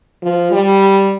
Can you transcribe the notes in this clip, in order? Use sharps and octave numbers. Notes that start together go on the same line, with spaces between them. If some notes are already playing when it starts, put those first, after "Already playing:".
F3
G3